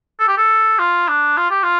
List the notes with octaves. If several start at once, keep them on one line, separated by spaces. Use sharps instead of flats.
A4
G4
A4
F4
D4
F4
G4
F4